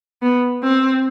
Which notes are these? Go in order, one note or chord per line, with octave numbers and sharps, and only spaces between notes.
B3
C4